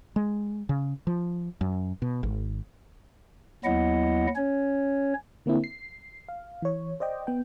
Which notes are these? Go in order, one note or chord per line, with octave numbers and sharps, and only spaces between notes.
G#3
C#3
F3
F#2
B2
G#1
D#2 F#3 B3 E4 D#5 F#5
C#4 C#5
D3 A#3 C4 E4
C7
F5
E3 C#5
C5 D5 D#5 G5
B3 G5